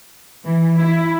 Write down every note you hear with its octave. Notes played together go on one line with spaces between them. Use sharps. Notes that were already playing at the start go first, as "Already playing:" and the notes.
E3
E4